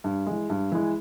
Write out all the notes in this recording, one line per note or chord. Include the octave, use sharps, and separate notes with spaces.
G2
E3 G#3
G2
E3 G#3